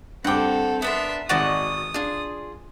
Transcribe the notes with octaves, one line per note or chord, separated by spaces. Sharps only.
G2 C4 A4 F#5 G5 D6
B3 D4 A#4 E5 C6
G#1 F#4 D5 D#5 F#5 D#6
D4 F4 G#4